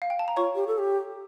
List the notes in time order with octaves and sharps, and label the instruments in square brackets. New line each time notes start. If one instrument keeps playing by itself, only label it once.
[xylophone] F5
G5
A5
A#5
[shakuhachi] F4 [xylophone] C#5 C#6
[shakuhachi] G4
A4
G4